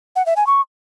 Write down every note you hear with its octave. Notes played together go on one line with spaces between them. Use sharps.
F#5
E5
G#5
C#6